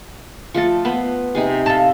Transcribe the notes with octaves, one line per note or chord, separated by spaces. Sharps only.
F3 A3 A4
B3 B4 C5
C3 D#4 G#4
F4 A4